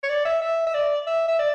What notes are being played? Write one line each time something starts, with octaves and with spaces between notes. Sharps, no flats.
C#5
D5
E5
E5
E5
D5
E5
E5
D5